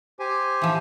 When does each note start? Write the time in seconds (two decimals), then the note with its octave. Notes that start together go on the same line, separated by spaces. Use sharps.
0.19 G4 C5 G#5
0.62 E3 F3